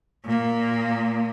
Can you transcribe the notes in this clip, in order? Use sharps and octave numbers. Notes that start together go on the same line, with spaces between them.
A#2 A#3